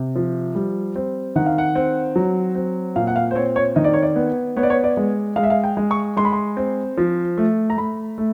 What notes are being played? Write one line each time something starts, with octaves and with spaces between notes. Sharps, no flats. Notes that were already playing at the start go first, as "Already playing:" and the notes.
Already playing: C3
F3
G3
C4
D#3 F#5
F5
F#5
C4
F#3
C4
A#2 F5
F#5
F5
C5
C4 C#5
C#5
D#3 D#5
D5
C#5
D5
B3
B3 C#5
D5
C#5
D5
G#3
G#3 F5
E5
F5
G5
G#3
C#6
G#3 C6
B5
C6
C4
F3
A3
A#5
A3 B5
A3